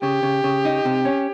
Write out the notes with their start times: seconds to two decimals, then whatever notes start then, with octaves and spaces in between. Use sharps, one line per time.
0.02 C#3 G4
0.23 C#3
0.44 C#3
0.65 D#4
0.85 C3
1.05 C#4